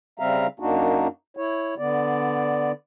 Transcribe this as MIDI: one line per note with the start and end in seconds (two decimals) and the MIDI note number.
0.19 0.47 49
0.19 0.47 55
0.19 0.47 60
0.19 0.47 76
0.19 0.47 77
0.19 0.47 82
0.60 1.08 42
0.60 1.08 58
0.60 1.08 62
0.60 1.08 63
0.60 1.08 66
1.37 1.75 64
1.37 1.75 73
1.78 2.72 50
1.78 2.72 59
1.78 2.72 74